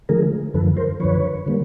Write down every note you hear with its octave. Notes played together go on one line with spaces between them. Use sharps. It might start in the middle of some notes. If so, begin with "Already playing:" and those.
D3 F3 A3 G#4 A#4
F#2 D3 F3 A4 B4
A#4 C5
F#2 D3 F3 B4 C#5
D3 G3 A#3